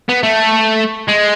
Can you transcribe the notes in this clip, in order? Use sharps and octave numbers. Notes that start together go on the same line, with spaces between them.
B3
A3
G#3